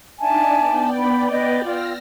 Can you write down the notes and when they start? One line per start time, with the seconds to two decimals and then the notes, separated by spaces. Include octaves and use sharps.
0.19 D4 D#4 D5 E5 G#5 A5
0.56 B3 D5 G5
0.96 B5
1.30 B4 D#5
1.65 F4 E6 F6 A#6